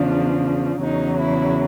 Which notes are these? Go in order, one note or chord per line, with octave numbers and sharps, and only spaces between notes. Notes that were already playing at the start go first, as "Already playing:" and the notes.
Already playing: E2 C#3 F3 D4
E2 C#3 F#3 D#4
E4